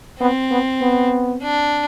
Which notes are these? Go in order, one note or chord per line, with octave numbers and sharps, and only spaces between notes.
B3 C4
B3
B3
D4